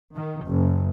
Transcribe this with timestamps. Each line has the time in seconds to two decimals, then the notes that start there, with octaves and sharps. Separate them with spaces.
0.15 D#3
0.46 F#1